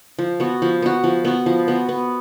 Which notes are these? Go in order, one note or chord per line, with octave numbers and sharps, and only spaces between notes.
F3
B3 F#4
F3
B3 F#4
F3
B3 F#4
F3
B3 F#4
B3